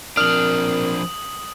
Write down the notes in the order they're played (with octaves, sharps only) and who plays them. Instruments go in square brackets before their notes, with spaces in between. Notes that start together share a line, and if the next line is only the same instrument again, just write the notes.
[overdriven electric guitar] F3 D4 [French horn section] C4 A#4 [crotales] D#6 F#7 [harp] F6